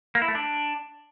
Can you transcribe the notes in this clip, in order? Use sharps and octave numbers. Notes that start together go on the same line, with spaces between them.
A#3
E4
A3
D4